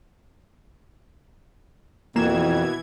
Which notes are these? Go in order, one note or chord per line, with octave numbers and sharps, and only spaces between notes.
F2 B2 E3 A#3 G#6 E7